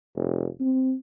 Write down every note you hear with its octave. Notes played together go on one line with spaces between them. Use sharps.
F1
C4